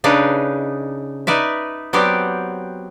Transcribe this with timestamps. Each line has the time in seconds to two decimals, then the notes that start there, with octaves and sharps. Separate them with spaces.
0.04 C#3 D4 D#4 A4 B4
1.27 D#4 B4 D5 E5
1.93 F#3 B3 C4 G4 D5